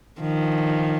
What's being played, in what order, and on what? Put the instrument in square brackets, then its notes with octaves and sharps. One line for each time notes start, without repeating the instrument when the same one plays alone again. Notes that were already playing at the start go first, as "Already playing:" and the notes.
[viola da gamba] D#3 F3